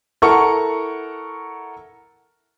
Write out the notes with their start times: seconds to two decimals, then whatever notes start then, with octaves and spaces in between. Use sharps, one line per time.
0.22 E4 A4 A#4 F#5 A#5 C#6